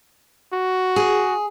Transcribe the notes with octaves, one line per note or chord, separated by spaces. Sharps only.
F#4
G#4